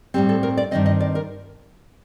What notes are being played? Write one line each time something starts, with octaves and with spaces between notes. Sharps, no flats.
A2 G3 C4 G4
A4
A#4
D5
G2 D#3 A3 C4 D#5
D#5
D5
A#4